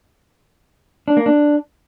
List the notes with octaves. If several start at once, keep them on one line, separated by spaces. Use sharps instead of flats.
D4
A#3
D4